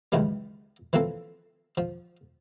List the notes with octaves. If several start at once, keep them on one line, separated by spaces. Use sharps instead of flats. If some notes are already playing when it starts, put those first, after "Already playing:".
C#2 F#2 D#3 E3 G3
E3 F3 A#3 C4 A4
F3